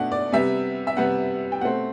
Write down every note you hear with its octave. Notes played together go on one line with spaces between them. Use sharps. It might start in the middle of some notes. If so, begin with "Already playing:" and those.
Already playing: B2 A3 D4 F#5
D5
C3 G3 B3 E5
E5
C3 G3 B3 F#5
G5
B2 A3 C4 F#5